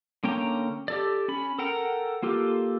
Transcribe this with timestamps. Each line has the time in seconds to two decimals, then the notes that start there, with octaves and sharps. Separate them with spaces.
0.24 D3 A#3 C#4 G5 A#5
0.88 G4 A4 D5
1.28 C#4 B5
1.59 A4 A#4 F#5 G5 A#5
2.23 A#3 F4 G4 A4